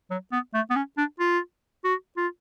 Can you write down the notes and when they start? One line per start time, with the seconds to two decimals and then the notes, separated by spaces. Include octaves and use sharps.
0.11 F#3
0.32 B3
0.54 A3
0.70 B3
0.76 C#4
0.98 D4
1.19 F4
1.84 F#4
2.17 F4